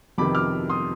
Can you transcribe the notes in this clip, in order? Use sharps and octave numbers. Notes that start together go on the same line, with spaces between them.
F2 C3 D#3 B3 B5 D6
D6 F6
C6 D#6